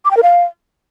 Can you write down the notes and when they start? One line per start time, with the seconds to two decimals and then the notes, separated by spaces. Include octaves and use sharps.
0.05 D6
0.11 G5
0.17 A#4
0.23 F5